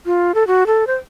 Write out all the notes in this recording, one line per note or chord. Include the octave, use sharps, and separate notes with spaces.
F4
A4
F#4
A4
C5